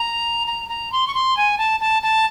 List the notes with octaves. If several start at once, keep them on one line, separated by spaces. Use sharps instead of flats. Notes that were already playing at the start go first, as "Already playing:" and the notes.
Already playing: A#5
A#5
A#5
C6
C#6
C6
G#5
A5
A5
A5